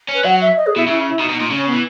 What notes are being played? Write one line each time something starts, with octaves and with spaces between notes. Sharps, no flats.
C#4
B4
F#3 F#5
E5
D#5
G#4
B2 E4
C#3 E4
E4
B2 D#4
B2
D#4
A#2
C#3 C#4
B3
E3